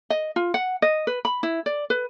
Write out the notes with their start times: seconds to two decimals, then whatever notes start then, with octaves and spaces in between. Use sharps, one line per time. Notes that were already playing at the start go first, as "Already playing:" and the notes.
0.10 D#5
0.36 F4
0.54 F#5
0.82 D#5
1.07 B4
1.25 B5
1.43 E4
1.66 D5
1.90 B4